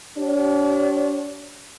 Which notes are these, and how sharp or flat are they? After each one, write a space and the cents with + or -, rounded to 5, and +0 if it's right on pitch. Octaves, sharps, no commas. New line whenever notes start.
D4 -35 G4 -40 C#5 -25